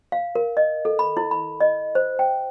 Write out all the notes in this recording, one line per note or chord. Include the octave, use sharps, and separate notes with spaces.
F5
A#4
D#5
A4
B5
E4
B5
D#5
C5
G5